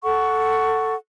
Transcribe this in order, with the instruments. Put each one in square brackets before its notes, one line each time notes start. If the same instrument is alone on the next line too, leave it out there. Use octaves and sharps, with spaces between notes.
[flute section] A4 F#5 C#6